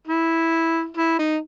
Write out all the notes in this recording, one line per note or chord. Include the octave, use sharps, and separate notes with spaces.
E4
E4
D#4